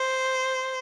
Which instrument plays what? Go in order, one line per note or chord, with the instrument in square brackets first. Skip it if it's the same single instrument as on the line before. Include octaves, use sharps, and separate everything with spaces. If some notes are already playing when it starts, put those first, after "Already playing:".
Already playing: [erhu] C5